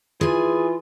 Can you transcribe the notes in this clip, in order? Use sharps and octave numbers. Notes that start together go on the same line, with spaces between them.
E3 F4 G#4 G#5